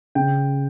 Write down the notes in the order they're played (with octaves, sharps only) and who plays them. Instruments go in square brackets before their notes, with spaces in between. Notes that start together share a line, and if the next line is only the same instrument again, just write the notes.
[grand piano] C#3 G5